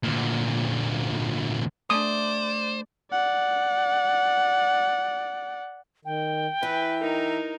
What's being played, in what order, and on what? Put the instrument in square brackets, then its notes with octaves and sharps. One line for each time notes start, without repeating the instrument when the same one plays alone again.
[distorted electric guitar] D2 A#2
[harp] A3 D4 [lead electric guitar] C5 [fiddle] D5 [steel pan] D#6
[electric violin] D5 F#5
[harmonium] D#3 [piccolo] G5
[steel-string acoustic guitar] E3 [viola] B4 [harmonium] E5
[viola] D#4 A#4